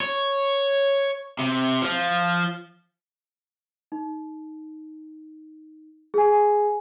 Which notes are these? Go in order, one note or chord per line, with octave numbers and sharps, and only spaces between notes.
C#5
C3
F3
D#4
G#4 G#5